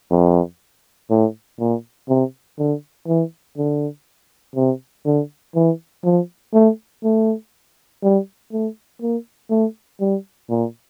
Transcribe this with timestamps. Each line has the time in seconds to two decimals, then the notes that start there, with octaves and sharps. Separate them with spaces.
0.10 F2
1.10 A2
1.59 A#2
2.09 C3
2.58 D3
3.08 E3
3.57 D3
4.56 C3
5.06 D3
5.55 E3
6.04 F3
6.54 A3
7.04 A3
8.03 G3
8.52 A3
9.02 A#3
9.50 A3
10.00 G3
10.50 A#2